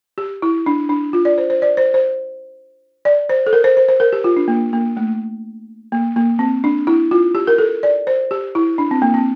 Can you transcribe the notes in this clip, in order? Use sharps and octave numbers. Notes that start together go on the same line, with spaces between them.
G4
E4
D4
D4
F4
D5
C5
C5
D5
C5
C5
D5
C5
A4
A#4
C5
C5
C5
A#4
G4
F4
D4
A#3
A#3
A3
A#3
A#3
C4
D4
E4
F4
G4
A#4
A4
D5
C5
G4
E4
D4
C4
A#3
C4